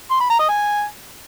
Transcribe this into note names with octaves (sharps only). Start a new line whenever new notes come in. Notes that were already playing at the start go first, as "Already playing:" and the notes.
C6
B5
A#5
D#5
G#5